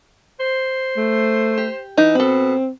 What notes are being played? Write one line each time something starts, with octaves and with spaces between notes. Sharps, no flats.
C5
A3
G4
E3 D#4
B2 C4 A4 B5